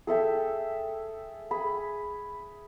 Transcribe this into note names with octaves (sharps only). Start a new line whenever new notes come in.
G#4 A4 E5 G5
G#4 B5